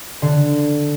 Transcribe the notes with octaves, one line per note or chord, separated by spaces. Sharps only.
D3